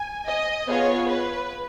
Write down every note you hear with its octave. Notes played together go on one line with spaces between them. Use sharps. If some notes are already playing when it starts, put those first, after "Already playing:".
Already playing: G#5
D#5
B3 F4 G#4 C#5
B4